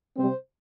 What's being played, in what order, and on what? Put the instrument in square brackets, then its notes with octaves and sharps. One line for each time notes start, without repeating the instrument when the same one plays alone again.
[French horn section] C3 G3 C4 C5